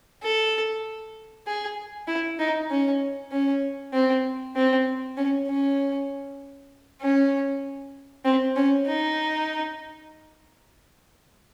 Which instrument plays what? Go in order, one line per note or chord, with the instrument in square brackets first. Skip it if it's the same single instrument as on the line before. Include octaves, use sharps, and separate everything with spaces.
[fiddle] A4
G#4
E4
D#4
C#4
C#4
C4
C4
C#4
C#4
C#4
C4
C#4
D#4